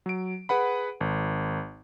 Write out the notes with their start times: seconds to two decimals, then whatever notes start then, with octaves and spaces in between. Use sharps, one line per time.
0.06 F#3 D7
0.49 G#4 B4 F#5 B5
1.01 G#1